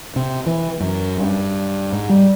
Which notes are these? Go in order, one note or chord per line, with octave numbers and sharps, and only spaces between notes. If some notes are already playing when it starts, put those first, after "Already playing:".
C3
E3
F#2
G2
G#2
G3